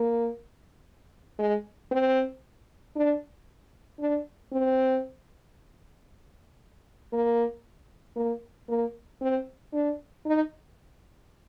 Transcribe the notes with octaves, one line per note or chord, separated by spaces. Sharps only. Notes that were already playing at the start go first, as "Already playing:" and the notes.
Already playing: A#3
G#3
C4
D4
D4
C4
A#3
A#3
A#3
C4
D4
D#4